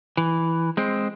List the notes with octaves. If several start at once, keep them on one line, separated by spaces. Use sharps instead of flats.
E3
G#3 C4